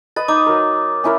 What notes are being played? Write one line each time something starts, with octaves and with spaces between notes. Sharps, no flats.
B4 D#5 A6
D#4 D6
F#3 A#4
C#4 E4 A#4